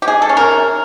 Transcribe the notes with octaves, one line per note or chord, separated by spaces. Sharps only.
G4
G#3 G#4
A4
C#4
A#4
C3